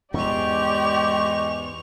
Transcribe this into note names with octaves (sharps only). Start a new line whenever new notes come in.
E2 G#2 E3 G#3 G4 D5 C#6 F7